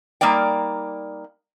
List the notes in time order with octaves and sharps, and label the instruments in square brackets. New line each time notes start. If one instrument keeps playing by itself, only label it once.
[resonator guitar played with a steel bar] G3 A#3 D#4 D5 G5